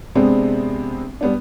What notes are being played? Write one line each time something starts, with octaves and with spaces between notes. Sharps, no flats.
C3 G#3 B3 C4 D4
G3 B3 D4